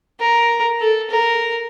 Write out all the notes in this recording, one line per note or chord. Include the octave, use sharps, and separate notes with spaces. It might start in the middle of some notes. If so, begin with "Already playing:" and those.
A#4
A4
A#4